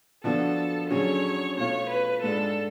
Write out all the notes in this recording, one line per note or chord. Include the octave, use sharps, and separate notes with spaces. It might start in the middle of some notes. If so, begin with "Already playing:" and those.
D3 F3 B3 D4 F#4 A4
D3 F#3 C#4 G#4 C#5
B2 A3 F4 C#5
B4
G#2 G#3 D4 A4